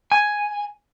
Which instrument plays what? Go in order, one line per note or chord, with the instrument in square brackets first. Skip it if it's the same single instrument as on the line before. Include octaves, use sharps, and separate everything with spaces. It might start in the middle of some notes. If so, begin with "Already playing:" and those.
[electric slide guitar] G#5